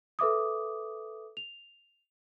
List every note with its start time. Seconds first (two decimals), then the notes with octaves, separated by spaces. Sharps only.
0.19 A4 B4 E5 D6 D#6
1.37 F7